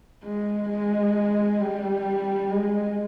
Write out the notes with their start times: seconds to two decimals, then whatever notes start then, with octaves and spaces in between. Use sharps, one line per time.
0.24 G#3
0.69 G#3
1.59 G3
2.50 G#3